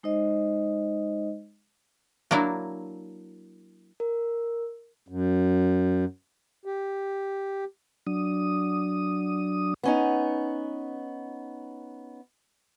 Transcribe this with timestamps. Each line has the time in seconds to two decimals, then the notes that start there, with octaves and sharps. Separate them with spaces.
0.03 G#3 D#4 C5 D#5
2.31 F#3 A#3 D4 E4
4.00 A#4
5.08 F#2
6.66 G4
8.07 F#3 D4 D#6
9.83 B3 C#4 D#4